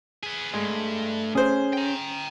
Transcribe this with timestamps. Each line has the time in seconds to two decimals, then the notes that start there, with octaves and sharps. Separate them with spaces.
0.23 B3 G#4
0.54 G2 G#3 A3
1.35 C#4 G#4 C5
1.73 G5 A#5